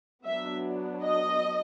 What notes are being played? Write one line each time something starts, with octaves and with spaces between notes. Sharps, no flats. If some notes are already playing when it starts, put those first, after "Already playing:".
F#3 B3 D4 E5
D#5